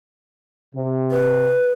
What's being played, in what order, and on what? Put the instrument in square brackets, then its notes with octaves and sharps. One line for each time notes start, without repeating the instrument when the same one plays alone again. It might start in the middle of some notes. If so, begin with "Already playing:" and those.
[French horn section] C3
[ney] B4